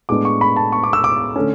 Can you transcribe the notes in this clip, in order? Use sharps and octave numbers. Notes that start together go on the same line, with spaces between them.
A2 G#3 B3 D4 D6
C#6
B5
A5
C#6
D6
E6
D6
D3 A3 C#4